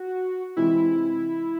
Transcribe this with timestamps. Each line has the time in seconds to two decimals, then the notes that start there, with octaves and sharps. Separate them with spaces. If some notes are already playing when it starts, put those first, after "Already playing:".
Already playing: F#4
0.57 C3 E3 G#3 C4 E4